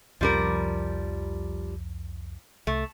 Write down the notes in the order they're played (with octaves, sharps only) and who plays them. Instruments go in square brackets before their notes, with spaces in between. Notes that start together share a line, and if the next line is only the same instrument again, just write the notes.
[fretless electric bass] C2 F2 C#4 [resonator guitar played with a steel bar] F3 G3 A#4
[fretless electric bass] C2 [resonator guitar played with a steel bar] A3